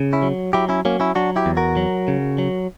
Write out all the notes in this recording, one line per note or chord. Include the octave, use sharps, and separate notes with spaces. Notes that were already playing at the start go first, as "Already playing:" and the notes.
Already playing: C#3
C#4 E4
F#3
F#3 E4 G4
C#4 E4
F#3 A#3 C#4
C#4 E4
F#3 D4 F#4
E4 G4
E2
F#4 A#4
F#3
C#3
F#3